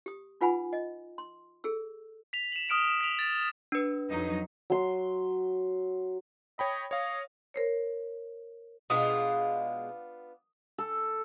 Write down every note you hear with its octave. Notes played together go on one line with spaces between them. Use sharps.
G4 D#6
D#4 F4 B4 F#5 G#5 B5
D#5
C6
G#4 A4 E6
B6 F7
E7 F#7
D#6 F6 D7 E7
E7
B6 D7 F7
A6
D4 B4
F2 F#3 D#4
F#3 C6
C#5 D#5 G5 B5
C#5 D#5 F5
A#4 C5 C#5
B2 G#3 B3 D4 F4 D#6
A4